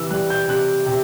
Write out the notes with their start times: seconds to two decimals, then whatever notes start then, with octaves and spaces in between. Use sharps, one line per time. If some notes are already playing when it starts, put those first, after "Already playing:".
Already playing: C3 E3 E6
0.11 G3 F#6
0.30 G6
0.48 C3 F#6
0.86 C3